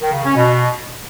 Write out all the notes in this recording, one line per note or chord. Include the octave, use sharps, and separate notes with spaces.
D#3
C#3
C#4
B2